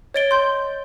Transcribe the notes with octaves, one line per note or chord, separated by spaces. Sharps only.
C#5 D#5 A6 D7 G7
C6 G6